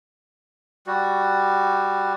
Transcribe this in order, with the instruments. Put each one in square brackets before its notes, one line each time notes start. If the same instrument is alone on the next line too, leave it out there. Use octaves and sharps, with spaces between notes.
[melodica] G3 F#4